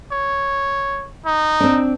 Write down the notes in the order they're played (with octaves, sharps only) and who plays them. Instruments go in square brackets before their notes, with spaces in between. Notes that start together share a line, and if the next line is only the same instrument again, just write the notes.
[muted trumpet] C#5
D#4
[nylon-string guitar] C4 D4